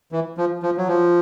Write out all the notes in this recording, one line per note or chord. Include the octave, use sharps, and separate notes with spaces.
E3
F3
F3
F#3
F3